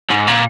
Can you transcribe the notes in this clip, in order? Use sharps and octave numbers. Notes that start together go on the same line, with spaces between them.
G#2
A#2